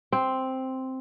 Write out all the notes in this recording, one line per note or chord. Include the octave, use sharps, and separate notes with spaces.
C4